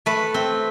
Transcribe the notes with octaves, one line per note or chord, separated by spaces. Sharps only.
A3 B4
C4